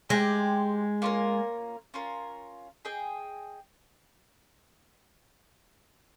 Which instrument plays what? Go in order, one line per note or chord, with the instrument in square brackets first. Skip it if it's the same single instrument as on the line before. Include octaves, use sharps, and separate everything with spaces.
[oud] G#3 [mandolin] G4 C5 G5
[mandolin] A#3 C#4 F4 A#4
C#4 F4 A#4
G#4 D#5 G5